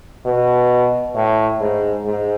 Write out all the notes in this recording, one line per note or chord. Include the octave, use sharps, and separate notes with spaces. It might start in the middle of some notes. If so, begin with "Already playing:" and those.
B2
A2
G#2
G#2